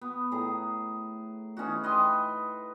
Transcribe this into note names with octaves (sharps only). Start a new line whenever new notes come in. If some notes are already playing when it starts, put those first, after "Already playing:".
B3
A2 G#4 A#5
E3 C#4 D#4 F#4
B4 D#5 G5 C6